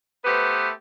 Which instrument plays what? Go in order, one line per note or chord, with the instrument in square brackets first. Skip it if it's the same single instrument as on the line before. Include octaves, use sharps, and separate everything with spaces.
[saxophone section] A3 B3 G4 B4 C5